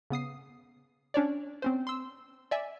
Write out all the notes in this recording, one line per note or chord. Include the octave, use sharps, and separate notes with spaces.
C#3 B3 D#6 C7
C#4 D4 C#5 D5
C4 C#4 C5
C6 E6
D5 E5 G#5